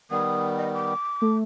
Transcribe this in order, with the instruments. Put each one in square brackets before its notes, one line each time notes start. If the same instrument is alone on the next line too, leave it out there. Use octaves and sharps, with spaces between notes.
[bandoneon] D#3 G3 B3 [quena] D#6
[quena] D#5
D6
[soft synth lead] A3